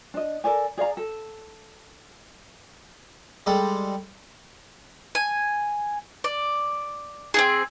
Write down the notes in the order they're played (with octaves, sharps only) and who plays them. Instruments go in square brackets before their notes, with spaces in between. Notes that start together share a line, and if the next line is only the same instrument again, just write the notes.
[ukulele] D4 D#5
A4 A#4 D5 G#5
G#4 D5 F5 A#5
A4
[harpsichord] G3 G#3 A4
[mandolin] G#5
D5
C4 D#4 G#4